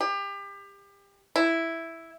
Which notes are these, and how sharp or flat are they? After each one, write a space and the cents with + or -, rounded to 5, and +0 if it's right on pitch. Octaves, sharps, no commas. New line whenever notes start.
G4 +30
E4 +0